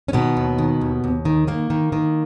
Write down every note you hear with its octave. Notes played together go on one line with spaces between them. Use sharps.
C#4
B2 D#3 B3
D#2
D#3
D#2
D#2
D#3
D#3 A#3
D#3
D#3